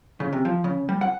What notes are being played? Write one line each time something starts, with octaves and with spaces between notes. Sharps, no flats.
C#3
C3
F3
C#3
G3
F#5